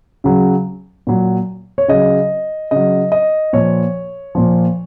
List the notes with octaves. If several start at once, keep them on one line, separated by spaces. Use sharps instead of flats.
C#3 F#3
A#2 F#3
C#5
C#3 F#3 D#5
C#3 F#3 D#5
D#5
A#2 F3 C#5
A#2 F3